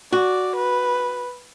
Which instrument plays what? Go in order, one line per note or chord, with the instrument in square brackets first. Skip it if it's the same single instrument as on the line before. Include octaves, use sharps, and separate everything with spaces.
[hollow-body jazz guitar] F#4 [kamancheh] D5
[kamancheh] B4